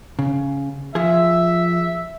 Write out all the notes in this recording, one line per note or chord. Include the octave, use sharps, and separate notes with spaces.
C#3
F3 G#4 E5